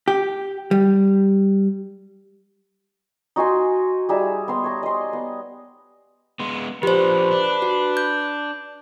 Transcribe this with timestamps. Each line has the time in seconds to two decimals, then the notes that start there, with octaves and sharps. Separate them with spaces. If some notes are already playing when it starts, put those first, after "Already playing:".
0.08 G4
0.71 G3
3.36 D#4 F#4 G#5 C6
4.09 G3 D#4 G#4 E5
4.48 B3 C6
4.64 C#5 A#5
4.83 D#5 C6
5.13 B3
6.40 G#3 B3
6.83 F3 D4 G4 B4 C5
7.31 D4
7.62 F#4
7.97 G6